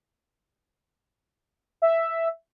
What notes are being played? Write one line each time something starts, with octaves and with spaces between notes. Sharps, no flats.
E5